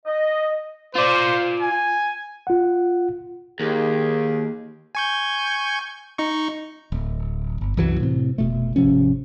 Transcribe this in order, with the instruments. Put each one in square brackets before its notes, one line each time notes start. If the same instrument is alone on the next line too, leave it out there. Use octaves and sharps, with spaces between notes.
[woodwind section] D#5
[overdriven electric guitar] F4 D5 [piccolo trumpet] C5
[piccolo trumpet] G#5
[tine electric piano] F4 F#5
[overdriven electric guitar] D#2 [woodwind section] D#3 G4 G#4
[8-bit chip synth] G#5 C#6 G6
D#4 C#6
[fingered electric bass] D1
G1
C2 F#2 E3 F#3
A2 C3
F1 B2 A3
G#1 C3 F3 C#4